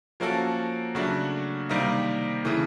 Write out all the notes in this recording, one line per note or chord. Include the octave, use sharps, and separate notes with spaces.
F3 A#3 C#4 F#4 A4
C#3 F#3 A3 D4 F#4
C3 D#3 G3 A#3 D#4
C#3 E3 A3